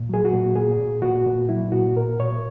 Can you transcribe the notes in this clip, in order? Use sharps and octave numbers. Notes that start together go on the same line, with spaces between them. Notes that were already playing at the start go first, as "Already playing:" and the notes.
Already playing: A#2
F#3 G#4
F#4
A#2
A#2 G#4
A#2
A#2 F#4
A#2
F#3 E4
A#2 F#4
A#2 A#4
A#2 C#5